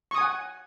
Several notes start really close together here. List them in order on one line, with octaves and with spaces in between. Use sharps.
C#6 D#6 G#5 F#5